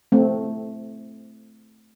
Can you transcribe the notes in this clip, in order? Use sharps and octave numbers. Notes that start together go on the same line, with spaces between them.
A3 C4